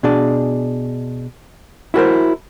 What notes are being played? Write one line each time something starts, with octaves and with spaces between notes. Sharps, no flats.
B2 D4 G#4 D5
E4 F#4 A#4 C5